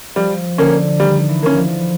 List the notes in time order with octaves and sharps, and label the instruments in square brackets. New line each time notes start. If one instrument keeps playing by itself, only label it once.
[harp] F3 [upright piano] G3
[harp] D3 [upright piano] A#3 C#4
[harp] D#3 [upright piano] G3
[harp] E3
[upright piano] A#3 C#4
[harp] F3